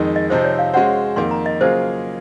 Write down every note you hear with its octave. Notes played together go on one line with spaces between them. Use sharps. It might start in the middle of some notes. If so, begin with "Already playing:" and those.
Already playing: F2 D#3 G#3 D#4
D#5
C3 F3 C4 D#4 C5
C#5
F5
G#3 C#4 F#4 C5 F#5
F2 D#3 A#3 C6
A#5
D#5
C#3 F#3 A#3 F4 G#4 C5